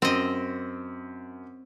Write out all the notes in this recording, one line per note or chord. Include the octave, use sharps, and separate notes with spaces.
F#2 C4 D#5